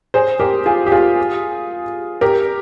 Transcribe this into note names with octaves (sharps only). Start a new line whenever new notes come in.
G#4 C5
G4 A#4
F4 G#4
G4
F4 G#4
G4 A#4